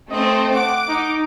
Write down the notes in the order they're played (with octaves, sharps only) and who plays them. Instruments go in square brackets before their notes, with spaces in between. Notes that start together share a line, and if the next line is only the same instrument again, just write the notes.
[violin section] A3 C4 [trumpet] D#5
[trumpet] F#5 [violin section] D6
[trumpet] D#4